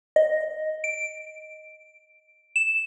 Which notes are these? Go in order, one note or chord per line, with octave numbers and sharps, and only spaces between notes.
D#5
D7
E7